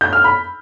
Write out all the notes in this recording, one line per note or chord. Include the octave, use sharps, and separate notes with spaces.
G6
F6
B5